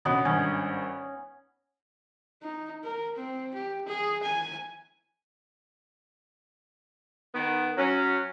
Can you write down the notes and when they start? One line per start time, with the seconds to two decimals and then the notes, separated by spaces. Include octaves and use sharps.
0.05 D2 B2 B3 C#4 D#5 B5
0.25 G#1 G2 C#4
2.43 D#4
2.83 A#4
3.15 C4
3.54 G4
3.86 G#4
4.23 G#5
7.34 D#3 B3
7.78 F#3 C#4